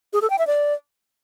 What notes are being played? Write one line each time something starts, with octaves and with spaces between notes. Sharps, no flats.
G#4
A4
G5
E5
D5